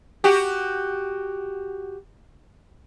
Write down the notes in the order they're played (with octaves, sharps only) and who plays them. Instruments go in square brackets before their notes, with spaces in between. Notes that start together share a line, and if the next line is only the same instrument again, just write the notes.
[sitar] F#4 G4